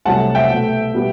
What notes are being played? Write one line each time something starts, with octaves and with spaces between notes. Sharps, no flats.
C2 C3 F#3 A3 F#5 A5
E5 G5
B2 A3
B2 G3 B3